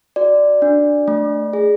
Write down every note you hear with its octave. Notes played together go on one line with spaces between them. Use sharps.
F#4 D5
D4
A3
G#4